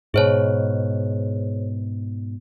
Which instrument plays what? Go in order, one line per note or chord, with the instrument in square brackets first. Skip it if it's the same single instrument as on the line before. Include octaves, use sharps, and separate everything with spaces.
[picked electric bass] G#2 B2 [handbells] G#4 C5 C#5